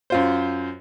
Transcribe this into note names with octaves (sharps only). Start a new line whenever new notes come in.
F#2 F4 C5